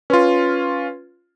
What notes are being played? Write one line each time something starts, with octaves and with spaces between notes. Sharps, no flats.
C#4 F4 B4 C6